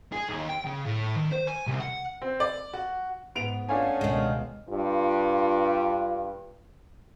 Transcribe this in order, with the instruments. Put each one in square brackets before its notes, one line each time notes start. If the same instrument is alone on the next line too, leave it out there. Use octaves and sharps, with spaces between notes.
[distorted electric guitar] G#4
D#2
G5
C#3
A2
D#3
C5
G#5
C2
F#5
[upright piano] C4
D5
F#4
[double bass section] G#2 [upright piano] B3 D7 F7
[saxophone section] A3 B3 C#4 [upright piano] D4 F5 G#5
[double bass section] C#2 B2 [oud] D#3 G#3
[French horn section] G2 F4